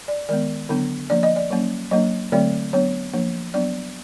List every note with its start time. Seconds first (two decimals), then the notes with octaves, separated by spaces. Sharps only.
0.08 D5
0.29 D#3 G#3 B3 D5
0.69 D3 F#3 B3 D4
1.10 F3 A#3 D4 D5
1.23 D#5
1.36 D5
1.51 F#3 A#3 C#4
1.91 F#3 A#3 D4 D#5
2.32 D3 F#3 A3 C4 D5
2.73 F#3 B3 D4 C#5
3.14 F3 A#3 D4
3.54 F#3 B3 D4 D5